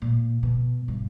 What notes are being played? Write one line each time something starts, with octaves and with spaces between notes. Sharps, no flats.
A#2
B2
G2